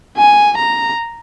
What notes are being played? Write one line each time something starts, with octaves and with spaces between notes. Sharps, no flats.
G#5
A#5